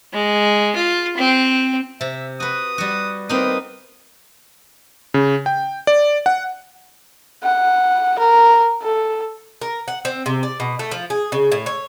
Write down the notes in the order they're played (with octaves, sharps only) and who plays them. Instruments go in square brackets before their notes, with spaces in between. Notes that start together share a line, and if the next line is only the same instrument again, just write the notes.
[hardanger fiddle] G#3
F4
C4
[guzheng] C3 [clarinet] E5
[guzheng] F#4 B4 [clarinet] D#6
[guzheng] G3 F#4
[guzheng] A#3 D#4 [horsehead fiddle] C4 B4 [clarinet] D#6
[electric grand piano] C#3
G5
D5
F#5
[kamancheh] F#5
A#4
A4
[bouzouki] A#4
F#5
C4
C3
D5
B2
A3
F3
G#4
C#3
A2
C#5